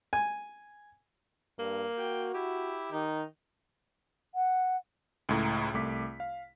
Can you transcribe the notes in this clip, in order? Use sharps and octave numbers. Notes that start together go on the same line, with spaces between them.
G#5
G2 A#3
F#4 G5
E4 G4
D#3 D#4
F#5
C#2 A2 A#5
C2 A3 D6 B6
F5